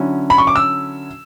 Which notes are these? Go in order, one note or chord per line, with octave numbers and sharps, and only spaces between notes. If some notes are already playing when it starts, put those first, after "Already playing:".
Already playing: D3 F#3 C#4 E4
B5
C#6
D6
E6